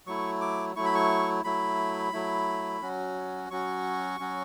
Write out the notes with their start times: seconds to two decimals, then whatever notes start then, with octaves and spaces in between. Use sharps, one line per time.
0.06 F#3 A3 E4 C#6
0.41 D6
0.76 F#3 A3 E4 C#6
0.85 B5
0.95 C#6
1.44 F#3 A3 E4 B5
2.13 F#3 A3 E4
2.82 F#3 C#4 F#4
3.50 F#3 C#4 F#4 C#6
4.20 F#3 C#4 F#4